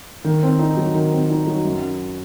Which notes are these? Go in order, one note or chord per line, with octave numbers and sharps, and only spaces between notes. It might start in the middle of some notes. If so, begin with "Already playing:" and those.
D#3
C4
D#4
F#3
D#3
C4
D#4
F#3
F#2